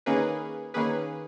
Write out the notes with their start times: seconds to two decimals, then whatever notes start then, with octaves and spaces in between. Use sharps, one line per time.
0.06 D#3 A#3 C#4 G#4 B4
0.74 D#3 A#3 C#4 G#4 B4